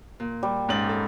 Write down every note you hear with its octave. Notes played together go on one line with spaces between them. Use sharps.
A#2
G3
G#2 C#4 D5 G5 F#7
A4